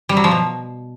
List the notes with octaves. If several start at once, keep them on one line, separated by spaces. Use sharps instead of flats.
G3
F#3
F3
B2